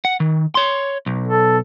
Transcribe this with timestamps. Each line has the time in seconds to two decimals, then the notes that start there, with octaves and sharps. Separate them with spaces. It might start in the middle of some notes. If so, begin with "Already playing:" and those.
0.05 F#5
0.20 D#3
0.55 C#5 C6
1.06 B1
1.28 A4